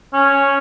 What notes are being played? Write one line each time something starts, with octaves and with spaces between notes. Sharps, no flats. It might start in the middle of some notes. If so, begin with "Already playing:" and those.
C#4